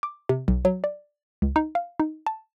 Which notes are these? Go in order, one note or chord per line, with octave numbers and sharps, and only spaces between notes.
D6
C3
B1
F#3
D5
C#2
D#4
F5
D#4
A5